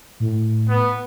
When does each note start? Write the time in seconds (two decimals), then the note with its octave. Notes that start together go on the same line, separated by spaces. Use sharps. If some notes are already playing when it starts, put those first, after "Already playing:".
0.20 A2
0.69 B3